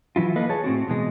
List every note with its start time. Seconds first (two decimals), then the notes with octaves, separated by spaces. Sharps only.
0.16 E3 F#3 E4 F4
0.36 A#3 A4 B4 D#5 F5
0.50 G#4 C#5 A5
0.64 A2 C4 F#4
0.88 B2 E3 G#3